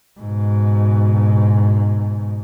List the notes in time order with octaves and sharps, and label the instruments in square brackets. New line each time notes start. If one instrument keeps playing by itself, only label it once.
[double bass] G#2 B2